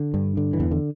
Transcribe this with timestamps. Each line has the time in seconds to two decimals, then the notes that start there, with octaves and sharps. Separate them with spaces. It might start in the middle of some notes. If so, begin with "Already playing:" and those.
Already playing: D3
0.14 G2
0.37 D3
0.53 E3
0.60 E2
0.71 D3